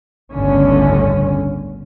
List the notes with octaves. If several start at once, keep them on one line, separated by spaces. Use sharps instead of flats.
G1 C#2 A2 D3 C#4